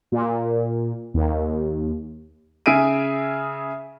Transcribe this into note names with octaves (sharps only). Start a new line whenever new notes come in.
A#2
D#2
C#3 G#4 E5 D7 D#7